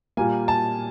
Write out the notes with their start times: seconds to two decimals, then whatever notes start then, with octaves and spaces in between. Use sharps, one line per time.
0.17 A#2 G3 A#3 G#5
0.48 A5